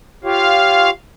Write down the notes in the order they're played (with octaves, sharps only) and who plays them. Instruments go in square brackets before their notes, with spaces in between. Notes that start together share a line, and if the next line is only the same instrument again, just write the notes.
[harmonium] F4 G4 C#5 [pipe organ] F5